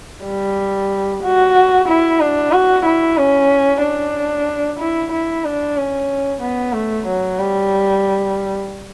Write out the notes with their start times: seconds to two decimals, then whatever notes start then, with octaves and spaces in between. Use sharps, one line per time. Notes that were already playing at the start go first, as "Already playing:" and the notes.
0.25 G3
1.23 F#4
1.88 E4
2.20 D4
2.52 F#4
2.85 E4
3.17 C#4
3.82 D4
4.79 E4
5.12 E4
5.44 D4
5.77 C#4
6.42 B3
6.74 A3
7.07 F#3
7.39 G3